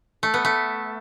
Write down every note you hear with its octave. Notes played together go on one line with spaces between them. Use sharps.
A3
B3
A3